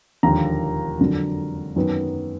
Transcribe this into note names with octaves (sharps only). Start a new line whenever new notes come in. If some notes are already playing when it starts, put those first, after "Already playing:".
E1 D#2 D3 F3 A#5
F2 D3 F#3
F#2 D#3 F#3 B3